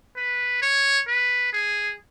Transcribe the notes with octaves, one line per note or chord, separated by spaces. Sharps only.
B4
C#5
B4
G#4